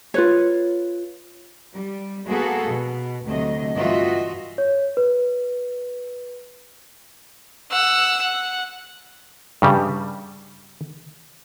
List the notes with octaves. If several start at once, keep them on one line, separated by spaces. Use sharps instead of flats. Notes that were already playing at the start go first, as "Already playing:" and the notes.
F4 B4 C#5
G3
A#3 B3 F#4 G#4 A4 B4
B2
D2 C3 F#3 A3 D#5
G2 E3 F4 F#4 D#5 E5
C#5
B4
F#5 E6
F#5
G2 C#3 G3